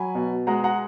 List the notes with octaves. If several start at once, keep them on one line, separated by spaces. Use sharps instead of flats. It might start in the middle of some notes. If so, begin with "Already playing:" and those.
Already playing: F#3 G#5 B5
B2
G#3 F#5 A#5
F#5 A#5